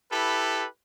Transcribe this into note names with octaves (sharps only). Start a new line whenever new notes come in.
E4 G4 A4 B4